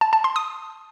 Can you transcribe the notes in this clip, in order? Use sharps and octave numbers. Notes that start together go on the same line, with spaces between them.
A5
A5
C6
D#6